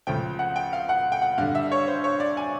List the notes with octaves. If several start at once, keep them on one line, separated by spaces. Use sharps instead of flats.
C#2 C#3 F3 A3 G5
F#5
G5
F5
F#5
G5
F#5
G2 D3 G3 F5
E5
C#5
C5
C#5
D5
G#5